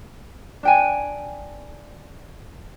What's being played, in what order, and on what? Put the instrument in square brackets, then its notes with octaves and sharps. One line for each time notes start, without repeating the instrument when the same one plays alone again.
[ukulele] D4 G5 G#5